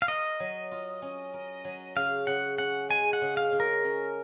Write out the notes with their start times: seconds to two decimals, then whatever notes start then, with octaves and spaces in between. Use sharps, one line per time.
0.02 F5
0.08 A#4 D#5
0.40 F#3
0.72 F4
1.02 C#4
1.34 A#4
1.65 F#3
1.96 C#3 F5
2.27 C#3 F#5
2.58 C#4 F#5
2.89 G#3 G#5
3.13 F#5
3.21 C#3
3.37 F5
3.52 C#3
3.60 A#4
3.84 C#4